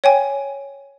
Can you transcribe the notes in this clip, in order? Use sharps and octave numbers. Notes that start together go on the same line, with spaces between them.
C#5 G5 G#5